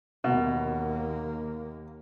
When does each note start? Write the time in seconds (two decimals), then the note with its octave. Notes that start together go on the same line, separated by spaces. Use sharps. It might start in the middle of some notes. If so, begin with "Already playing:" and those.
0.24 D#2 B2 A#3